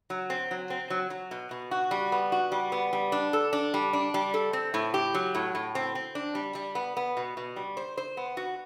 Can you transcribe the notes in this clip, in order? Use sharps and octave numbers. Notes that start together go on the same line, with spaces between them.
F#3
C4
F#3
C4
F#3
F#3
B2
B2
F#4
G3
B3
F#4
G3
B3
G3
D4
A4
D4
G3
D4
G3
A4
C4
A2
G4
F#3
A2
A2
C4
C4
D4
G3
G3
B3
B3
B2
B2
G3
C5
C5
B3
F#4